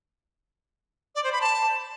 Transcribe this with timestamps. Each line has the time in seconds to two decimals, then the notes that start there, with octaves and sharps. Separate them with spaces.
1.15 D5
1.24 C5
1.33 B5
1.41 A5